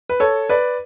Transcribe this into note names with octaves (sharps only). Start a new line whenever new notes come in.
B4
A4 C#5
B4 D5